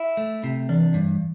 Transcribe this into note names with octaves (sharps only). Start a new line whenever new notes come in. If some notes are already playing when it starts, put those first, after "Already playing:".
Already playing: E4
A3
C3
E3 D4
G2